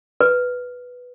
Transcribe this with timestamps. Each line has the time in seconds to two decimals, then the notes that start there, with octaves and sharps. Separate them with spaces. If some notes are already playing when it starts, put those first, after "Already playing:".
0.21 B4